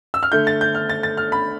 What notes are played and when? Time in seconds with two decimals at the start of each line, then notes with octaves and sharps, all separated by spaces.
0.14 E6
0.23 F6
0.32 D3 A3 G6
0.47 A6
0.61 G6
0.75 F6
0.89 A6
1.03 A6
1.17 F6
1.32 B5